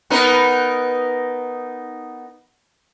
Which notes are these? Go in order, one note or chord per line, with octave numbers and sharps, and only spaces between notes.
B3 D#4 A#4